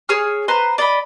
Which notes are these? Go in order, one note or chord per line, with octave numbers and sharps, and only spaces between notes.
G#4 C#5 D#6 F6
B4 C5 A#5 C6
D5 D#5 B5